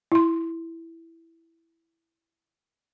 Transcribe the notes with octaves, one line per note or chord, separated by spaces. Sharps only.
E4 C6